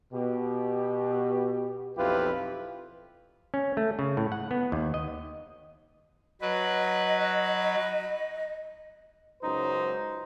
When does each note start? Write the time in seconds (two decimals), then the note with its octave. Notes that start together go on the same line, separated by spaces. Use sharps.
0.13 B2 G4
1.97 B1 F2 E4 F4 G4 B4
3.54 C#4
3.77 A3
3.99 C#3
4.17 A2
4.32 F#5
4.51 B3
4.72 D#2
4.94 D#5
6.41 F#3 B4 D#5
9.43 C#2 F#2 D#4 C5